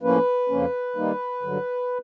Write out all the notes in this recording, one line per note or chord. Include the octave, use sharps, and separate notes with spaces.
A2 F3 A#3 C#4 B4
F2 C#3 F3 A#3 C#4
D#3 G3 A#3 D#4
G2 D3 F#3